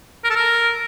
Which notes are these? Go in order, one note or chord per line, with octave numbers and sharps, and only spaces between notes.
A#4
A4
A#4